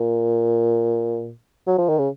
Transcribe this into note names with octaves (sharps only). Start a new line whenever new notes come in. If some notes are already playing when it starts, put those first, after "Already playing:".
Already playing: A#2
F#3
F3
D#3
C#3